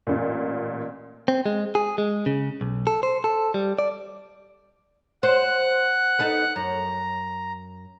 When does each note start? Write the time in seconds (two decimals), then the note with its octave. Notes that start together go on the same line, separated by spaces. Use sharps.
0.07 A1 A#2
1.28 C4
1.46 G#3
1.75 G#4
1.98 G#3
2.26 C#3
2.61 B1
2.87 A4
3.03 C5
3.24 A4
3.54 G3
3.79 D5
5.23 C5 F#5 F#6
6.19 B3 D#4 A4
6.56 F#2 A#5